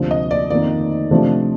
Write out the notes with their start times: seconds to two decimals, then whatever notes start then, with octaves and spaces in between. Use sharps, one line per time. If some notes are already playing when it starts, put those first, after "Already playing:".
Already playing: D2 C3 F3 A#3 D4
0.11 D#5
0.31 D5
0.50 F2 D#3 A#3 D5
1.11 C3 F3 A3 D4 A4